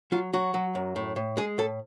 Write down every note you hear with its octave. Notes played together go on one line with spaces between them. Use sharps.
F#3 F4
F#3 F#4
F#3
F#2
A2
A2
G#3 G#4
A2 A4